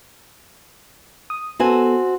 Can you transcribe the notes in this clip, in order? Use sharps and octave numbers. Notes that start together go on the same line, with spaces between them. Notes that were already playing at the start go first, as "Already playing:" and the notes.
D#6
B3 C4 F#4 A4 G#5